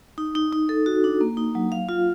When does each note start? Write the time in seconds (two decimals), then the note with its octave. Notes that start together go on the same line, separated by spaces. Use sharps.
0.18 D#4
0.35 D#4
0.53 D#4
0.69 A4
0.86 F#4
1.04 D4
1.21 A#3
1.37 D#4
1.55 F#3
1.72 F5
1.89 F4